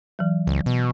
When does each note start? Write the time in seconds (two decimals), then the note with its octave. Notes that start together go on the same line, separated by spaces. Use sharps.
0.19 E3 F#3
0.47 C#2
0.66 B2